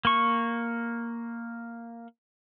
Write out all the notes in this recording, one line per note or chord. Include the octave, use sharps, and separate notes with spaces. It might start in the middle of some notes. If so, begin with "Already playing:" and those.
A#3 C#6